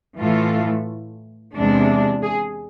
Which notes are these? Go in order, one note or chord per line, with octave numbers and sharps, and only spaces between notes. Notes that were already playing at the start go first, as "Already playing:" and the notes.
A2 E3 A3 F4
E2 C3 G#3 D4
G#4